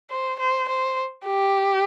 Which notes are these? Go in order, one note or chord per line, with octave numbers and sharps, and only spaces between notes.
C5
C5
C5
G4